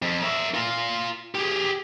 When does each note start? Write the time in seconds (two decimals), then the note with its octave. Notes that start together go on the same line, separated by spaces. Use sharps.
0.02 F2
0.23 A#4 E5
0.54 F4 A#4
1.35 G4 G#4